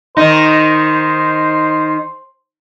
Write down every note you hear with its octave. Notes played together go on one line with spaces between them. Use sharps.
D#3 D#4 C5